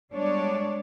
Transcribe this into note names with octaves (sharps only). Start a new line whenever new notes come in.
G3 G#3 B3 D4 C#5 D5